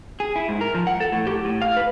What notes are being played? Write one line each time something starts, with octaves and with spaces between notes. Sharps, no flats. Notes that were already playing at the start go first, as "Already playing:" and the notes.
G#4
E4
G#2
A#4
F3
F#5
A4
A2
G4
A2
F5
B4